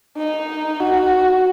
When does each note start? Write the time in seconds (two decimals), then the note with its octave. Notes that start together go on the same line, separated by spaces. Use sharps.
0.17 D#4
0.80 F#4